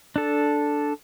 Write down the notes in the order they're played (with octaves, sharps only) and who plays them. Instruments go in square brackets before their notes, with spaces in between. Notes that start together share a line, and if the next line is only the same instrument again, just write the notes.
[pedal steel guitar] D4 A4